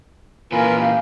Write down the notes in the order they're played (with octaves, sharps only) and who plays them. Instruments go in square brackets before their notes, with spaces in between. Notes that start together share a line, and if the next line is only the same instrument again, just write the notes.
[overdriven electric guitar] A#2 E3 [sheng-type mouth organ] F4 A#4 B4 [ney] G#5
[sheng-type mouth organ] G4 [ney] F5